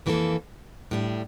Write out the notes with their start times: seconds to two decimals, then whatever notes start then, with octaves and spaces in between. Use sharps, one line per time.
0.06 F2 E3 A#3 F4 A4
0.91 A2 G3 D4